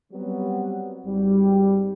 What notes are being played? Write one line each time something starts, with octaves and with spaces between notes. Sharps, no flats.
F#3 G3 B3 C4 F#4
G#1 G3